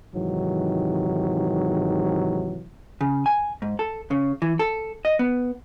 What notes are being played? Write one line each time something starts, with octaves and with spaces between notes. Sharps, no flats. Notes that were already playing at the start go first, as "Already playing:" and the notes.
G#2 C3 D#3 E3 F#3
C#3
G#5
G#2
A4
C#3
E3
A4
D#5
B3